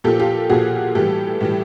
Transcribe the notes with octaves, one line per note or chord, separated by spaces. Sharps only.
A#2 F3 G4 A4
F4 G4
A#2 F3 F#4 G#4
A2 E3 G3 G4 A4
A2 E3 G3